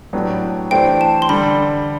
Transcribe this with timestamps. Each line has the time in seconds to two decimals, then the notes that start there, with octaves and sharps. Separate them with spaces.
0.13 A2 F#3 B3 D4 G4
0.71 E3 A3 D4 G4 C5 G5
1.01 A5
1.22 C6
1.29 D3 G3 D4 A4 B5